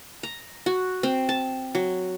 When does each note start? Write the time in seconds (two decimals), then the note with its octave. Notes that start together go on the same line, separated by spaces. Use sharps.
0.23 A#5
0.66 F#4
1.03 C4
1.29 A5
1.75 F#3